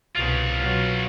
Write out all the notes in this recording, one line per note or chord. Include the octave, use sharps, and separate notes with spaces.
C2 B2 F4 C#5
B2 F#3